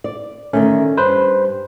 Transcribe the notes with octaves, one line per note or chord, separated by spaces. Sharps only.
D5
D3 D#3 A3 C#4
G2 B4 C5